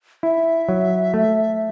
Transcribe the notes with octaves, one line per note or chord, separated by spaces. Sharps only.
E4 E5
F#3
A3